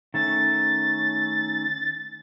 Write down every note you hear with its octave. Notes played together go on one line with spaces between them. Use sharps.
D#3 A3 C#4 A6